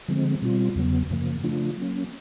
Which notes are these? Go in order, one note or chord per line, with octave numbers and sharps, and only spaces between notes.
D3 F3 G#3 C4
B2 G3 C4 F4
E2 C#3 F#3 B3
F#2 C#3 F3 A#3
C#3 F3 A3 D4 F4
F#3 A#3 C#4